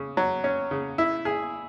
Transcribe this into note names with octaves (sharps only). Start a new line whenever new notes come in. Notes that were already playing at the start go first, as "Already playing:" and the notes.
Already playing: C#3
F#3
C#4
C#3
E4
G#4